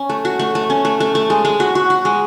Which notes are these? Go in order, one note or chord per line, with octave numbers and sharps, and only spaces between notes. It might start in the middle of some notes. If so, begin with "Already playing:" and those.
Already playing: C#4
A3
F#4
A3
A3
C#4
A3
A3
A3
G#3
G#3
F#4
F#4
F#4
G#3